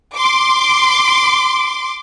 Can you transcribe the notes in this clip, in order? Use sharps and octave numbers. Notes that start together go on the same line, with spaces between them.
C6 D6